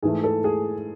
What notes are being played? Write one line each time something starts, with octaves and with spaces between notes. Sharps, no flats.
G#2 E3 A3 G#4
A4
G#4